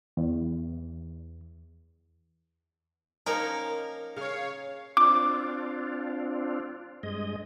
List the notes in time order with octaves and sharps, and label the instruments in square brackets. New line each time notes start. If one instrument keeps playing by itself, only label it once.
[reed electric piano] E2
[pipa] F3 A#3 [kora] C#4 D#4 C#5 [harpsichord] A#4
[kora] C#3 [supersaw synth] C#5 F5
[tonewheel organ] C4 D4 F4 [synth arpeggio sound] D6
[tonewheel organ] G2 G#3 D#5